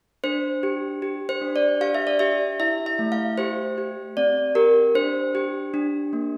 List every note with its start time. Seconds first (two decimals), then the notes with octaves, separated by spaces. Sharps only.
0.24 D4 C5
0.63 G4
1.02 G4
1.29 C5
1.41 D4
1.56 D5
1.81 G4 F5
1.95 E5
2.07 D5
2.19 G4 E5
2.60 E4 E5
2.86 E5
2.99 A3
3.12 F5
3.38 G4 C5
3.78 G4
4.17 C4 D5
4.55 G4 A#4
4.95 D4 C5
5.35 G4
5.74 D4
6.13 A#3